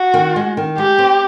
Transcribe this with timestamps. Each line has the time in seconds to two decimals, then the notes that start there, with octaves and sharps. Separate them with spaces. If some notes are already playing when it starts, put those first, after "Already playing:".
Already playing: F#4
0.14 D#3
0.36 G#3
0.57 D#3
0.78 G#3 G4
0.99 C4